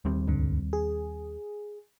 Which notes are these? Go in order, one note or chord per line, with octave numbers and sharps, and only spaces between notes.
D#2 G3 C4
C#2 G2 D3
G#4